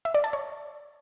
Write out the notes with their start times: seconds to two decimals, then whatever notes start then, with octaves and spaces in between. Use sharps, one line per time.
0.05 E5
0.15 D5
0.24 A5
0.33 C#5